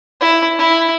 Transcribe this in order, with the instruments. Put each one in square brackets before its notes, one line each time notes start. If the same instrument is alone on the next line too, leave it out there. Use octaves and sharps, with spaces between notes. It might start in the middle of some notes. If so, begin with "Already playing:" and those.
[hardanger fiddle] E4
E4